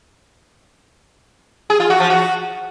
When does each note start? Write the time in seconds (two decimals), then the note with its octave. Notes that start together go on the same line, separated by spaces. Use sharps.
1.70 G#4
1.80 F4
1.90 F#4
2.00 F3
2.10 F#4